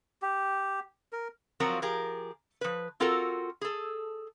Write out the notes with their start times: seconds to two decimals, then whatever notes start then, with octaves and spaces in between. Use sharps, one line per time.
0.22 G4
1.13 A#4
1.60 F3 F#3 C4 F4 F#4 A#4
1.82 F3 G4 G#4 A#4
2.61 F3 B4
3.00 C4 F4 F#4 A4 A#4
3.61 G#4 A4